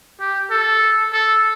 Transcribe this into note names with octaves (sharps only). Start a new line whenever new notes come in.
G4
A4
A4